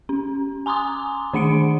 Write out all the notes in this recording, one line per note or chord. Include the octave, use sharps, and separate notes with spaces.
C#4
G#5 A#5 C6 D6 D#6
D#3 D4 F#5 C#7 D7